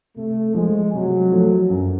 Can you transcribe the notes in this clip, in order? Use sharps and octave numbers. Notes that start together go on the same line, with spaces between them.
C3 A3
F3 G#3 A3
C3 F#3
F3 A3
F#2